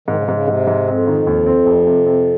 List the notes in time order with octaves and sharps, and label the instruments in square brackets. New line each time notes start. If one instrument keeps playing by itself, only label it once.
[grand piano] G#2 [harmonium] D#3
[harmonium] C#3
C3
[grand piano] G#2 [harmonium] C#3
[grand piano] G#2 [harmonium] C3
[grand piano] G#2
[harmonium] F2 [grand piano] C4
[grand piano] D#3
D#2
C4
F1
C3
C3